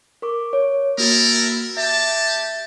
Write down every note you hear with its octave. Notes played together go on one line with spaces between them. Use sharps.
A#4 C#6 D6
C#5
A#3 E4 F#4 A4 A#4 A6
G4 E5 A5